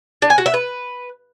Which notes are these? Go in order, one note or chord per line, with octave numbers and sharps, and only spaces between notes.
D4
G#5
F#4
E5
B4